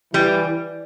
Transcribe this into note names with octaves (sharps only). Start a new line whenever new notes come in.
E3 G3